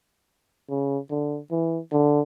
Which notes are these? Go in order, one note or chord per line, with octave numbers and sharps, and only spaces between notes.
C#3
D3
E3
D3